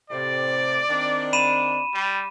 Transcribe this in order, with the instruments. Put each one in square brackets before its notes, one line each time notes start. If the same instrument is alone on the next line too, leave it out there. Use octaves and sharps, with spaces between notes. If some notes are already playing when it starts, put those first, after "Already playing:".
[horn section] A2 C3 [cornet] D5
[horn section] D#3 C4 D4
[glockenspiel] B5 D#7 E7
[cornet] G3